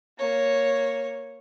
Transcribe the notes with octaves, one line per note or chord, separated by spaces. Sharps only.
A#3 C#5